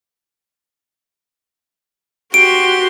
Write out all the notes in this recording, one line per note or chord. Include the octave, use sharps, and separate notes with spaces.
F#4 G4 C6 D7